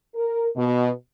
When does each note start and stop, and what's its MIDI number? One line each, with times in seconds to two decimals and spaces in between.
0.15 0.48 70
0.56 0.91 47